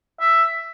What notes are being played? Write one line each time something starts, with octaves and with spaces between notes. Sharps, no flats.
E5